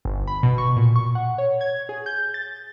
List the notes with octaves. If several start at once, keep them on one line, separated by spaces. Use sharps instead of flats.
G1
B5
B2
C#6
A#2
C#6
F#5
C#5
G#6
G#4
G6
A6